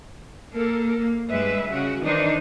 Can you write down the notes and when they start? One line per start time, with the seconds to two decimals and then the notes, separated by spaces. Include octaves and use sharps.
0.52 A#3 A4 A#4
0.98 A#3
1.28 G2 G3 G#3 B4 E5
1.70 C#3 F#4
2.02 D#3 E3 D4 D#4 C5